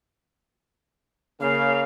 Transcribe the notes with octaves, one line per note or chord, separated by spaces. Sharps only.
C#3 A#3 F5